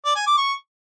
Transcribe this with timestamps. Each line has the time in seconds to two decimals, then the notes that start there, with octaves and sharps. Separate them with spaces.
0.05 D5
0.16 G#5
0.27 D6
0.37 C#6